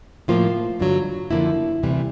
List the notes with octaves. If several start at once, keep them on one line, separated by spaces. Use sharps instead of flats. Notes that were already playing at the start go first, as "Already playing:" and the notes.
A2 F3 A#3 F4
G2 D3 F#3
F#2 D3 F3 A#3 E4
D2 C3 E3 G3